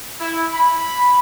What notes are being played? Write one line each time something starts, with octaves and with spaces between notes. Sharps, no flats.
E4
B5